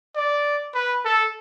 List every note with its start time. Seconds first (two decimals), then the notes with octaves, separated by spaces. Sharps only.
0.16 D5
0.74 B4
1.05 A4